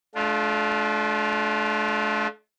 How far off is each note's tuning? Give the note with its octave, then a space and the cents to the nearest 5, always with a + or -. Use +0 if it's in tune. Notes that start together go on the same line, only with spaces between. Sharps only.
A3 -40 D4 +0 F4 +0